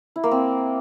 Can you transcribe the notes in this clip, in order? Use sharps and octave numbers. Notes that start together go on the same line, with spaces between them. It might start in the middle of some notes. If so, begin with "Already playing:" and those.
E4
A#3
C4